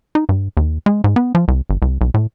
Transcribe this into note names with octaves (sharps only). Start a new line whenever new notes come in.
D#4
G2
D#2
G#3
G#2
B3
F3
C2
G1
C2
B1
A2